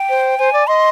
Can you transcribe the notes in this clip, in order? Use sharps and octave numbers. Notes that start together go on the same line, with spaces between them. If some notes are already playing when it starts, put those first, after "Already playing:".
Already playing: G5
C5
C5 G#5
D5
D#5 C6